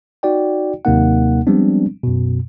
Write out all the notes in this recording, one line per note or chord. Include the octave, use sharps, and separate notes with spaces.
D#4 F#4 D5 G5
D#2 C3 F#3 A#3 D#4 F#5
F3 G3 G#3 B3 C4 D4
F#2 B2